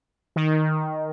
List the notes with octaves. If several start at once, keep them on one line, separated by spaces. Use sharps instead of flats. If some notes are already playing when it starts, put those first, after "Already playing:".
D#3